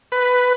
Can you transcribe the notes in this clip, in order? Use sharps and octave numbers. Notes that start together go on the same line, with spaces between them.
B4